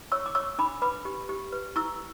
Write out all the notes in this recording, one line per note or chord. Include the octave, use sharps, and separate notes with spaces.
C#5 C#6 E6
D6
C#5 C#6 E6
D4 B5 D6
B4 B5 D6
G4
G4
B4
E4 C#6 E6